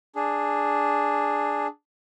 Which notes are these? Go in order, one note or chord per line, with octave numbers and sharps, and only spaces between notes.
D4 G#4